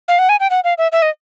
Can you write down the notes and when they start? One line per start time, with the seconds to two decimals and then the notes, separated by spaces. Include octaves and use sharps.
0.08 F5
0.19 F#5
0.29 G#5
0.40 G5
0.50 F#5
0.64 F5
0.78 E5
0.92 E5
1.02 D#5